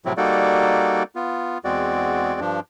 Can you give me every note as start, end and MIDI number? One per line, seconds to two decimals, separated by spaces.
0.05 0.13 45
0.05 0.13 48
0.05 0.13 53
0.05 0.13 54
0.05 0.13 60
0.05 0.13 64
0.17 1.03 55
0.17 1.03 58
0.17 1.03 63
0.17 1.03 66
0.17 1.03 69
0.17 1.03 74
1.15 1.58 59
1.15 1.58 65
1.64 2.40 40
1.64 2.40 56
1.64 2.40 60
1.64 2.40 66
1.64 2.40 74
2.40 2.60 43
2.40 2.60 53
2.40 2.60 62